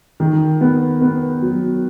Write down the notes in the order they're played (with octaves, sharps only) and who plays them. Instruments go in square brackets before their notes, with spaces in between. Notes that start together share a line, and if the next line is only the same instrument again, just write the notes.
[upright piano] D#3
B3
B3
F#3